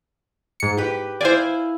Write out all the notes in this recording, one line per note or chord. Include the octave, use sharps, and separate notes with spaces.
G#2 C#7
G4 B4
E4 C5 D5 F5 G#5